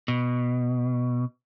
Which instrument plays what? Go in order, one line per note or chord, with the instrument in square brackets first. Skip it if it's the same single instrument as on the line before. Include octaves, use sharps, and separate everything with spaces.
[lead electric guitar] B2